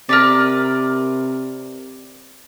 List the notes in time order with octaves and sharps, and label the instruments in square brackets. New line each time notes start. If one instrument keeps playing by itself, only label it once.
[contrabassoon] C3 [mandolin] A#4 B4 D5